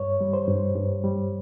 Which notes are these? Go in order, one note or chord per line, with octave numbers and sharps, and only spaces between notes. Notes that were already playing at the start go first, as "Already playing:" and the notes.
Already playing: G2 C#5
G3
C5
G2
G2
G3